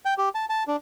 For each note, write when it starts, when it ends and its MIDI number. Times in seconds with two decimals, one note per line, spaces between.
0.05 0.14 79
0.18 0.29 67
0.35 0.45 81
0.49 0.63 81
0.68 0.76 62